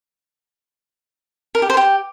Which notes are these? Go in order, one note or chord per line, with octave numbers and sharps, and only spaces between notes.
A#4
G4
C5
G4